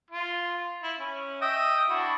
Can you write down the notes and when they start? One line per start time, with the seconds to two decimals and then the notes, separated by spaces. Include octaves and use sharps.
0.11 F4
0.84 E4
1.00 C#4
1.41 D#5 E5 G5
1.89 D4 E4 F#4